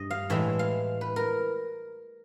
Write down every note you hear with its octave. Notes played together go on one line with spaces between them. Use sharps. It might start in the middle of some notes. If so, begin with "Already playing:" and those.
Already playing: G2 D#5
F5
A2 E3 G#3 E5
F5
B4
A#4